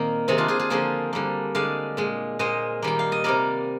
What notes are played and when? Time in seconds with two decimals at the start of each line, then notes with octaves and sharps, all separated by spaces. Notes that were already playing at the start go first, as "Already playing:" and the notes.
Already playing: A#2 D#3 A#3 C4
0.28 C3 D#3 G#3 C4 D#4
0.38 D4 F4
0.48 F4 G#4
0.59 F4 G#4
0.70 D3 F3 A#3 G#4 C5
1.13 D3 G3 A#3
1.55 D3 G#3 D5 F5
1.97 A#2 G#3
2.39 A#2 G#3 C5 D#5
2.82 D#3 G3 A#3 G5
2.99 F5
3.12 D#5
3.24 C3 G3 A#3 A#4 D5